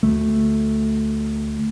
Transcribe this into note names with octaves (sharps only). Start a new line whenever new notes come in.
D2 A3